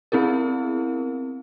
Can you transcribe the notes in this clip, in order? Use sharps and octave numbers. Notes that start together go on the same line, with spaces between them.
B3 C4 E4 G#4 A#4